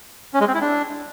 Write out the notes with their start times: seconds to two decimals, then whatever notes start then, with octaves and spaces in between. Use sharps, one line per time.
0.34 C#4
0.41 G#3
0.48 C4
0.54 E4
0.61 D4